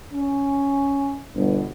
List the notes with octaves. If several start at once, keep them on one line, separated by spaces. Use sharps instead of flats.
C#4
G1 B2